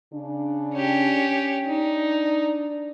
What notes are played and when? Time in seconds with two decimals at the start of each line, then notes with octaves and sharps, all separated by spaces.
0.13 C#3 D4
0.73 C#4 G4
1.66 D4 D#4 D5